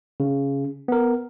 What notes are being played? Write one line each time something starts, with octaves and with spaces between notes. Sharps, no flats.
C#3
B3 A#4